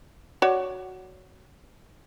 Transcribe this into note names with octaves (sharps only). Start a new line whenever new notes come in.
F#4 C#5 D5